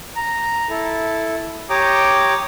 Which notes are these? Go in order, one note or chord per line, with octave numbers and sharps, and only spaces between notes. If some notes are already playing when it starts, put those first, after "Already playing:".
A#5
E4 A4
G4 C#5 G5 A#5 D6 D#6